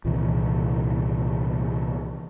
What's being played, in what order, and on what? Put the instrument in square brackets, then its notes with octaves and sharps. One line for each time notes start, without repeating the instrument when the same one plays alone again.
[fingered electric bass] C2 A#2 D#3 E3